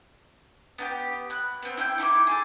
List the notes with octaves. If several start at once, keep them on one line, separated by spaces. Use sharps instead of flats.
B3 D#4 G4
B5 F#6
B3 C4
E4 G5 C6 G6
D#4 E4 C#6 D6
G#4 A4